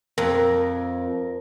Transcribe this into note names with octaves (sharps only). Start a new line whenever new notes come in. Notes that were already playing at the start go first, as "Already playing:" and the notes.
F2 A#4